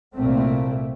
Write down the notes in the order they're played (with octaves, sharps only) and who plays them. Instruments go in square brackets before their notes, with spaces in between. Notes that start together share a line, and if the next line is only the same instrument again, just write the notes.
[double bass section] C2 A#2 A3 C4